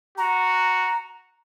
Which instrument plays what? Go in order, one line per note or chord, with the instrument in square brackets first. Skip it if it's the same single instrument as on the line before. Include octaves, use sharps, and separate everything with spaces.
[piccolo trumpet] F#4 [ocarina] A#5